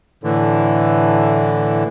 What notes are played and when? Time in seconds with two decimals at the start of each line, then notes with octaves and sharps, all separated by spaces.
0.24 A2 D3 E3